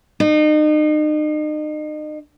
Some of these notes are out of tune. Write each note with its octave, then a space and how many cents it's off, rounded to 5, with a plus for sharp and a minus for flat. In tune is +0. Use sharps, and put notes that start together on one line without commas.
D#4 -35